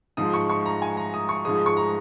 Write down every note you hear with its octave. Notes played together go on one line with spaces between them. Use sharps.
G#2 F3 G#3 D#6
C#6
C#6
A#5
G#5
A#5
D#6
C#6
G#2 F3 G#3 D#6
D#6
C#6
A#5